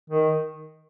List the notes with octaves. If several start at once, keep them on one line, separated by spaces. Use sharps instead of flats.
D#3